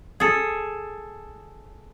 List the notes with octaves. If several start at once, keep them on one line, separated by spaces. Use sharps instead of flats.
G#4 A4